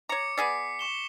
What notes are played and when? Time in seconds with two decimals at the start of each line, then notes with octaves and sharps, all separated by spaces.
0.09 C#5 A#5 D6 C#7
0.37 B3 G#4 D5 B6 C7
0.79 C#6 E7 G7